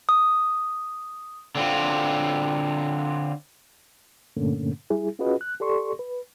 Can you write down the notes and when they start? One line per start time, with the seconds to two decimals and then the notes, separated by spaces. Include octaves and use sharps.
0.09 D#6
1.55 D3 C4 F4
4.36 G2 A#2 D3 A3 A#3 C#4
4.90 G3 E4 G#4
5.19 C#4 F4 F#4 G#4 B4 D#5
5.41 F#6
5.60 G4 A4 D5 C6 C#6
5.99 B4